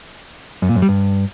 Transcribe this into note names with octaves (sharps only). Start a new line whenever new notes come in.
F#2
A#2
F#2
G3
G2